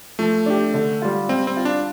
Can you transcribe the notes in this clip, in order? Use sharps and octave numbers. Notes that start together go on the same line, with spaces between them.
F3 A3
D4 G4
D3
G3 F4
G3 C4
C4
F4
D4